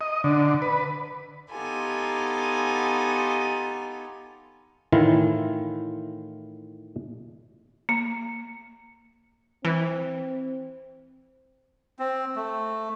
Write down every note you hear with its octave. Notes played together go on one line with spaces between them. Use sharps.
D#5
D3
B4
B3 D#4 F4 G4 A4 G#5
A2 D#3 E3 E4 F4
A#3
E3 C4
C4
A3